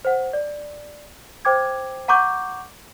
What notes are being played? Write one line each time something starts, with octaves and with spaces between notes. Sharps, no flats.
C5 F#5
D5
C5 G5 D6 G#6
F#5 A#5 C#6 D6 G6